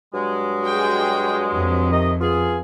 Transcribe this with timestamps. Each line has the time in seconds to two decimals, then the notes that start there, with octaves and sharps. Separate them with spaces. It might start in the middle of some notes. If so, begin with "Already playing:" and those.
0.14 G2 F#3 G#3
0.61 F#4 G#4 G5
1.54 F2
1.91 C3 D#3 D#5
2.21 B3 F4 G#4